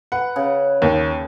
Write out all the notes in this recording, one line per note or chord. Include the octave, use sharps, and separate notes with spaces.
B4 F#5
C#3
D#2